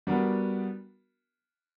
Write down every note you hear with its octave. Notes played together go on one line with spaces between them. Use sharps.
G3 B3 D4 F#4 A#4